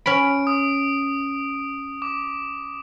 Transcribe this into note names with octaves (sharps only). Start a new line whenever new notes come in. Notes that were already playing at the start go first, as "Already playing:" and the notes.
C#4 B5 D7
D#6
D6